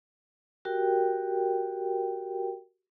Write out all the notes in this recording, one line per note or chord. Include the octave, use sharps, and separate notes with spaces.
F#4 G4 A#4 G5